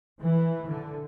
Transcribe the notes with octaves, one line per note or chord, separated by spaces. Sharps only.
E3
D3